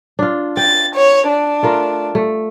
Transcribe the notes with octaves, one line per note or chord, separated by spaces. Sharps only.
D4 F4
G5 A6
C#5
D4
A3 F4 A#4
A3